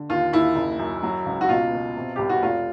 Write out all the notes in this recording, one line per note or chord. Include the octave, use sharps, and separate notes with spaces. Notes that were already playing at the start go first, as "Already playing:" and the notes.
Already playing: D3
D#2 F4
D#2 E4
F#1
F#2
F#3
C#2
F#4
B2 F4
B2
C3
C2 G4
F#4
F1 F4